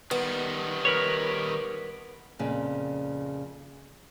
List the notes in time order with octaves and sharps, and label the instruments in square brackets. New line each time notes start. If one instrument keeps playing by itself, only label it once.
[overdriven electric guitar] D#3 G3 [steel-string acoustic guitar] B3
[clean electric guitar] A#4 B4 C#5
[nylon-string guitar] F2 A#2 C#3